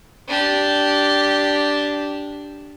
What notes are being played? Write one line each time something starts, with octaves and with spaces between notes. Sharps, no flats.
D4 G4